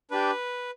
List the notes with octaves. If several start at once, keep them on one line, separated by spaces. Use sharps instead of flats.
D4 G4 B4